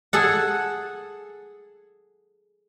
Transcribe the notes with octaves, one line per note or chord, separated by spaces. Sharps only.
G#4 A4 F#5